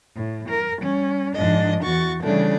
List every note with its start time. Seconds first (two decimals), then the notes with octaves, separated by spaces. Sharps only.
0.15 A2
0.48 A#4
0.80 G3 C#4
1.34 G#2 F3 D4 D#5
1.82 E2 E3 F#4 C#6 A6
2.23 C#3 E3 G3 A3 D4